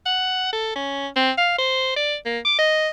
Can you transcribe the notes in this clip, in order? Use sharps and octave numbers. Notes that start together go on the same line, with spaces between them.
F#5
A4
C#4
C4
F5
C5
D5
A#3
D6
D#5